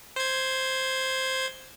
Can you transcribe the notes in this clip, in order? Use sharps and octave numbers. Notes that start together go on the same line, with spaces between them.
C5 G#6